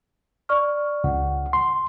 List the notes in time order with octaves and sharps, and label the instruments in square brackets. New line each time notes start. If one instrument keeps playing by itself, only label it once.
[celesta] D5 C#6 F6
[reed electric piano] C#2 [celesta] F#5
[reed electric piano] C6